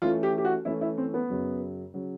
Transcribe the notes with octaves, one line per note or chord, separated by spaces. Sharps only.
E3 A3 C#4 F4
G4
G4
F#4
E3 A3 C#4 E4
E4
C4
B3
F#2 C#3 F#3
C#3 F#3